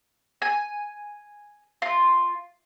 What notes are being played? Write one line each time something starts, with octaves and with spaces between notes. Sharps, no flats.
G#5
F4